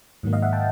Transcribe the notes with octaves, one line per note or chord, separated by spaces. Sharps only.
G#2 D#3 F#3 A#3
D#5 F5
E5 F#5
G5 A5